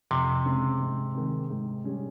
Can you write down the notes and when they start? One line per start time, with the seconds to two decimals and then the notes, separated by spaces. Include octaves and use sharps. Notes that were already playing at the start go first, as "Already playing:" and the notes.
0.11 F2 C3
0.46 C#3 G#3 C4
0.80 G#2
1.15 D#3 G#3 C4
1.50 G#2
1.84 G3 C#4 G#4